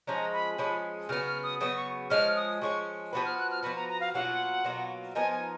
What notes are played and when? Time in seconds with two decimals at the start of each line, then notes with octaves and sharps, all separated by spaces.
0.07 F3 G#3 C#4 G#4 A#5
0.33 B5
0.58 F3 G#3 C#4 G#4 B5
1.09 C#3 F#3 B3 F6
1.26 F6
1.43 D#6
1.60 C#3 F#3 B3 D#6
1.76 C#6
2.10 F3 G#3 C#4 F6
2.36 D#6
2.62 F3 G#3 C#4 C#6
3.13 F3 B3 F#4 B4 B5
3.26 F6
3.38 F#6
3.51 F6
3.63 F3 B3 F#4 B4 B5
3.76 A#5
3.89 A#5
4.00 F5
4.14 B2 F#3 A#3 F4 F#5
4.64 B2 F#3 A#3 F4
5.15 F3 B3 D#4 A#4 G#5
5.32 G#5